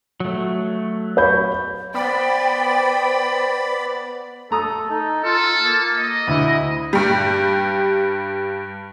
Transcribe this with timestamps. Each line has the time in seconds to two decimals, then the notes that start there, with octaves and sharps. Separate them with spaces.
0.20 F#3 A3
1.17 C#5 B5 G6
1.94 B3 C5 D5 G5 B5
4.51 A3 A4 A#5 D#6
4.90 D#4
5.24 F4 A4
5.58 A#3
5.97 D#5
6.27 D2 E4
6.93 G2 G3